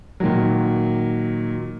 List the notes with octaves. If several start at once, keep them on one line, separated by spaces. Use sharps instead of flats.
A#2 D#3 F#3